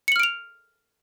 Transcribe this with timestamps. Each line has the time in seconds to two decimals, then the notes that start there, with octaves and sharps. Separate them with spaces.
0.08 C#7
0.12 F#7
0.16 F6
0.20 D7
0.23 F7